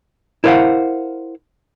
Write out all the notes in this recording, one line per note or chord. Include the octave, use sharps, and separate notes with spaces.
E4 A#4 C5 C#5 F5 F#5